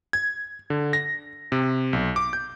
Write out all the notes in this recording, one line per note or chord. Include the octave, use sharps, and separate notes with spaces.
G#6
D3
A#6
C3
B1
D6
G6